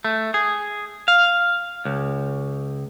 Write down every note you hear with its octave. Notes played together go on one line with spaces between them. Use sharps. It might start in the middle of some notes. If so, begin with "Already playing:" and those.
A3
G#4
F5
C#2